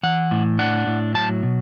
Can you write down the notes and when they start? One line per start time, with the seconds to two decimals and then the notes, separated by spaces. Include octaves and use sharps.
0.03 E3 F#5
0.31 A2
0.59 D4 F#5
0.87 A2
1.15 F#3 A5
1.43 B2